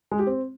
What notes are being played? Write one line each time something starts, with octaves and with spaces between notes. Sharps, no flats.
G#3
G4
C4